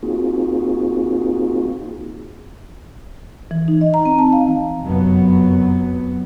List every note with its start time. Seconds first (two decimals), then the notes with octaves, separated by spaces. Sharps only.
0.03 A#3 C4 D#4 F4 F#4 G#4
3.51 E3
3.68 D#4
3.81 D#5
3.94 A#5
4.05 C4
4.19 A5
4.33 F5
4.82 F1 F#2 F#3 B3